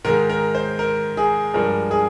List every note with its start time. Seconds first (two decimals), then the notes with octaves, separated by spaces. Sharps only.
0.04 G#2 D#3 G#3 A#4
0.30 A#4
0.55 C5
0.79 A#4
1.17 G#4
1.54 G2 F3 G#3 A#4
1.91 G#4